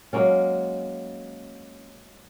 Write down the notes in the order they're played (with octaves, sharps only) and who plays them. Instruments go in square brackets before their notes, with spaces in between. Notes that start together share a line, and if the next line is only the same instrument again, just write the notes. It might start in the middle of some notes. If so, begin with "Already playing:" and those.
[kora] F#3 G#3 A#3 C#4